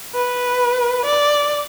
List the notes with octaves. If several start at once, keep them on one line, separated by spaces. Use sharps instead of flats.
B4
D5